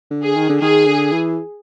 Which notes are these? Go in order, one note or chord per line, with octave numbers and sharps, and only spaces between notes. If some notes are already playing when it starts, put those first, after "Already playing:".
D3
G#4
D#3
D3
D#3 G#4
D3
E3